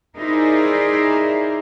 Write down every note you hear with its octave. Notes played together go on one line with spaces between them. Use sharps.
D#4 E4 G#4 A#4 C5 D5